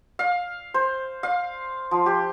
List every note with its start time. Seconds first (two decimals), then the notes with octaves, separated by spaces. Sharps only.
0.19 F5
0.74 C5
1.23 F5
1.91 F3
2.06 G4